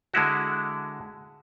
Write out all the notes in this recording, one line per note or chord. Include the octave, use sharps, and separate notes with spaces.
D3 G#3 E4 F#4